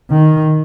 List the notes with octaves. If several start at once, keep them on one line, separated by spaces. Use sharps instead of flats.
D#3